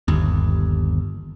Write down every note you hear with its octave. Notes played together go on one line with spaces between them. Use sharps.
G1 D#2